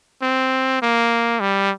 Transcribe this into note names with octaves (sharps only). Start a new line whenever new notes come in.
C4
A#3
G3